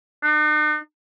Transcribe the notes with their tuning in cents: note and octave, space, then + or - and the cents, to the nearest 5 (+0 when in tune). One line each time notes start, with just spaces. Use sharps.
D#4 -45